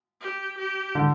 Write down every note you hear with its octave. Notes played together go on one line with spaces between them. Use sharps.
G4
G4
D3